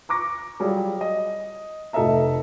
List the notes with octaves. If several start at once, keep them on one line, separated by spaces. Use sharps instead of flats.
A#5 C#6 D6 A#6
F#3 G3 F4 G#4
D#5
F1 A3 A4 D#5 E5 A#5